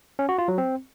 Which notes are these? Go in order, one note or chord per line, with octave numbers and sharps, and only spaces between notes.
C#4
F#4
F4
F#3
C4